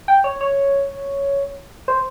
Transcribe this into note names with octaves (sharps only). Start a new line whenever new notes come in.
G5
C#5
C#5
C5